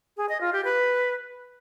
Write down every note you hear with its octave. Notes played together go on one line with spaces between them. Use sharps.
G#4
D#5
F4
G4
B4